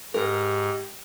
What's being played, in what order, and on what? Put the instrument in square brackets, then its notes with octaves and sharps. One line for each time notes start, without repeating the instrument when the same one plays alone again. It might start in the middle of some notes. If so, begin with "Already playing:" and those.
[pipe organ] G#2 [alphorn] G4 [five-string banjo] A#4